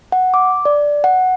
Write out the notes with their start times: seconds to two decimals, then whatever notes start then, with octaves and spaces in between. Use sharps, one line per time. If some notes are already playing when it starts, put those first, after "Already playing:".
0.12 F#5
0.34 D6
0.65 D5
1.04 F#5